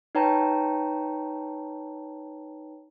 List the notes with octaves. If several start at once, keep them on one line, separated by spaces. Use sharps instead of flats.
D#4 B4 C#5 G5 A5 A#5